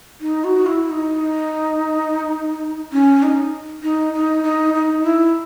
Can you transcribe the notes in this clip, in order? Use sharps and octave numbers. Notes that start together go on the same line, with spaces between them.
D#4
F#4
E4
D#4
C#4
D#4
D#4
D#4
D#4
D#4
E4